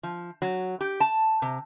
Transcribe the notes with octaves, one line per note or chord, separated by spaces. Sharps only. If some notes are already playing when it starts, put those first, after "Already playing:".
F3
F#3
G4
A5
C3